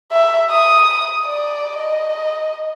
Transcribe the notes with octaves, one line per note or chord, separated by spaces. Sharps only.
E5
D#6
D5
D#5